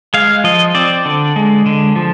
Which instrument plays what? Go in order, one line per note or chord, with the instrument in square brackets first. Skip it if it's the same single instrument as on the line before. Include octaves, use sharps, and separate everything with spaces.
[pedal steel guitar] G#3 F5
F3 D#5
C4 D5
D3
G#3
D3
F3